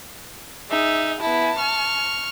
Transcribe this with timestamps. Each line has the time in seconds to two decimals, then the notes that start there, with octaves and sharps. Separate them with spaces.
0.70 D#4 G#4 E5
1.21 B3 E4 A5
1.57 C#6 F6